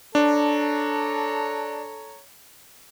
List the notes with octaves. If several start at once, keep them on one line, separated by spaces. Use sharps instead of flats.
D4 A4 C#5 A#5